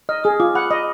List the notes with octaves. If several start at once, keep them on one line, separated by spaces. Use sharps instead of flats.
D#5 F6
G#4 D#6
F4 D6
F#5 B5
D#5 B5